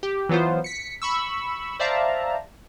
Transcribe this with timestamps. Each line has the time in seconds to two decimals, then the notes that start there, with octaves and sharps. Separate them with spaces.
0.03 G4
0.29 E3 F#3 B3 F4 C5
0.64 B6 C#7
1.02 B5 C#6 E6
1.80 C5 D5 E5 F5 A5 A#5